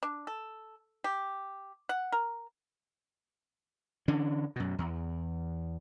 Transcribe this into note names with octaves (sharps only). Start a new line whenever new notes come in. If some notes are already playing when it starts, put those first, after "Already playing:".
D4
A4
G4
F#5
A#4
D3 E3 C#4 D4
F#2 B2
E2